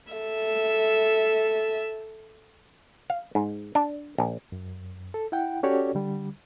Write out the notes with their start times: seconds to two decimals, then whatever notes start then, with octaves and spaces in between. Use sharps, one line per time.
0.12 A4 E5
3.10 F5
3.35 G#2
3.75 D4
4.18 A#1
4.52 F#2
5.14 A4
5.32 E4 F#5 G5
5.63 C#4 F#4 G4 A4 C#5 D5
5.95 D3 G3